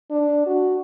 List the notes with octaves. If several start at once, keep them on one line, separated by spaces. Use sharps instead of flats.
D4
F#4